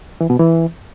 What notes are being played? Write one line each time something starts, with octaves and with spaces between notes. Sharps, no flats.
E3
B2
E3